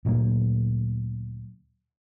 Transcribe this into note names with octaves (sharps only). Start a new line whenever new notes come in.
D2 A#2 F#3 A#3